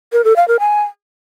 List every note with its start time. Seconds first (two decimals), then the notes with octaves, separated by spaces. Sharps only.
0.13 A#4
0.24 A4
0.36 F5
0.48 A#4
0.60 G#5